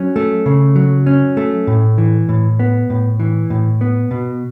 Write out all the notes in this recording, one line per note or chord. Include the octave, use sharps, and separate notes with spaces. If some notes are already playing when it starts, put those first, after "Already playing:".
Already playing: F#3 C#4
A3
C#3
F#3
C#4
A3
A2
E3
A2
B3
A2
E3
A2
B3
B2